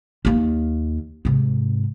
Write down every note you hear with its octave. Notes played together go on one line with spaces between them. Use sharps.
D#2 A#3
G#2 C3